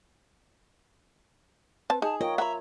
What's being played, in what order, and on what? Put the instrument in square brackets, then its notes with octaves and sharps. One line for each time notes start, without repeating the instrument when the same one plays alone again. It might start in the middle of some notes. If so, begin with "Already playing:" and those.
[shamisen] C4 A5 [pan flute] B4
[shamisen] D#4 [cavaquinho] G#4 [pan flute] A5
[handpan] F4 A#4 C#5 [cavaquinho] D#5 [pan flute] G5
[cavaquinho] E5 [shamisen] F#5 B5 [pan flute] A#5